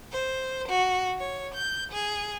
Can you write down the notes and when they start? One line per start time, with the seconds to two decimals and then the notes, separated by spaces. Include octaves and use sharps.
0.12 C5
0.68 F#4
1.19 C#5
1.55 G6
1.92 G#4